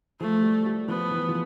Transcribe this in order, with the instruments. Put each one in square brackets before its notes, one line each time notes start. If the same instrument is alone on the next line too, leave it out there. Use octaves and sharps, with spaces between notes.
[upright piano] F3 [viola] A3
[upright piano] G3
G3
[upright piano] F3 [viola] B3
[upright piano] E3
F3